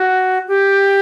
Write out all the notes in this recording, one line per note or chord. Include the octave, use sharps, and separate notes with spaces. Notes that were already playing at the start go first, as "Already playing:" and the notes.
Already playing: F#4
G4